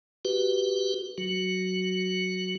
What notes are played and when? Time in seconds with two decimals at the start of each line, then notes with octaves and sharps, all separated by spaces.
0.25 F#4 G4 B4
1.18 F#3 F#4